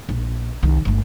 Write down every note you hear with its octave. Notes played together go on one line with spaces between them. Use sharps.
A#1
C2 D#3
G1 A3